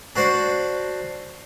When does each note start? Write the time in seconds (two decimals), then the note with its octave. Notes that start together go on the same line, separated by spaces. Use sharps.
0.16 D4 F#4 C5 D5